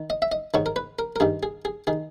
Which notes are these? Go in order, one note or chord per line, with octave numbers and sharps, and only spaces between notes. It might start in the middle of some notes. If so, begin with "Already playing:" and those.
Already playing: D#3
D#5
E5
D#5
G#2 D#3 C#5
A#4
B4
A#4
A#4
G2 D#3 G#4
G#4
G#4
D#3 G#4